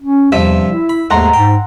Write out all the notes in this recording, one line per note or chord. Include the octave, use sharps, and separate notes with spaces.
C#4
E2 G2 C3 F3 E5
E4
B5
D#2 G#2 A3 F#5 A#5 C6
G#2 G5